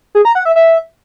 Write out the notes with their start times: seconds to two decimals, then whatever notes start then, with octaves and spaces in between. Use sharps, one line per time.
0.15 G#4
0.25 A#5
0.35 F#5
0.45 E5
0.56 E5